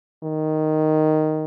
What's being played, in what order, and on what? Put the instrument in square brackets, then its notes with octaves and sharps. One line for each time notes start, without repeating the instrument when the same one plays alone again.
[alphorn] D#3